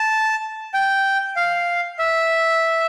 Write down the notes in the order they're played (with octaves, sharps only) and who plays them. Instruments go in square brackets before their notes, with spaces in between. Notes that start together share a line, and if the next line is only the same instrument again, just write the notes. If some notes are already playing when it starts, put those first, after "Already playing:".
Already playing: [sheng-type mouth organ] A5
G5
F5
E5